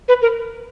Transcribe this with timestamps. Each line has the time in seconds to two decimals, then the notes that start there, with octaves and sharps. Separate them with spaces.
0.09 B4
0.22 A#4